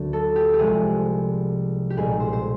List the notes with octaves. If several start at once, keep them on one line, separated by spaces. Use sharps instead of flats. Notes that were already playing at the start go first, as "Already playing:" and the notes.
Already playing: D2 D3 F#3 A#3
A4
G4
G4
C2 C3 F3 G#3 G#4
G4
B1 A#2 G3 A#3 G#4
C5
C5